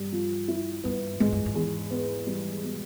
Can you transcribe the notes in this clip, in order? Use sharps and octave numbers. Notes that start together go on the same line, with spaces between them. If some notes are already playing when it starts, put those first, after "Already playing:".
Already playing: G2 G3
F3
E4
G2 B3
G#2 G#3
G2
G#2
E2
B3
G3
B2